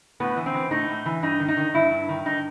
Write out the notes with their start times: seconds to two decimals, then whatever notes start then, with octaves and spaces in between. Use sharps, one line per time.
0.20 A2 B3
0.36 E3
0.46 C4
0.54 E3
0.71 A2 D#4
0.88 A2
1.06 E3
1.23 G2 D#4
1.40 D#3
1.48 D#4
1.57 D#3
1.74 G2 E4
1.91 G2
2.09 D#3
2.25 G2 D#4